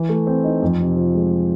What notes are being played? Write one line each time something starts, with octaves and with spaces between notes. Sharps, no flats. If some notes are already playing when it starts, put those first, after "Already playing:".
Already playing: E3
A3
C4
D#4
F2
C3
F3
G#3